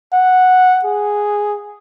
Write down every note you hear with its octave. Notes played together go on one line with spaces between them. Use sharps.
F#5
G#4